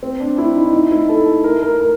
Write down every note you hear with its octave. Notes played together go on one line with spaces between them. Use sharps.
C4
D4
E4
D#4
D#4
E4
A4
A#4
A#4
A#4